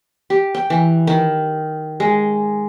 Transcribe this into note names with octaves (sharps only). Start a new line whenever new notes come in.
G4
G5
E3
D#3
G#3